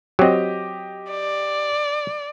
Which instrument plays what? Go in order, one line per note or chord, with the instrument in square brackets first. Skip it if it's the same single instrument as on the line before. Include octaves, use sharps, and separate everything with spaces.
[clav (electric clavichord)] F#3 C4 [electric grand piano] G4 D#5
[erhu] D5